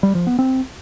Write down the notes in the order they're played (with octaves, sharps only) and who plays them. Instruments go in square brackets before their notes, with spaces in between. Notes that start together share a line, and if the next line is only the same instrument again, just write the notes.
[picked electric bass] G3
F3
B3
C4